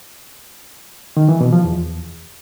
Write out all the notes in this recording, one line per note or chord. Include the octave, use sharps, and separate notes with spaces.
D#3
E3
B2
F3
E2